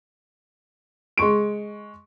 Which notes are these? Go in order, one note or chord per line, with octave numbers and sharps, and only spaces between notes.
G#3 C6 C#6 D7